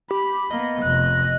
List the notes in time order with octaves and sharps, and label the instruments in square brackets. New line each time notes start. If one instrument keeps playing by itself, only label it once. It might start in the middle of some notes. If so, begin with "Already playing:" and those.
[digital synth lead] G4 [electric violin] B5
[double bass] A#3 B3 [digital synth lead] D#5
[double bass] F1 [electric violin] F#6